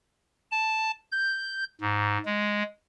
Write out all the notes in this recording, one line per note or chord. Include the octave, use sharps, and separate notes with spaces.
A5
G6
G#2
G#3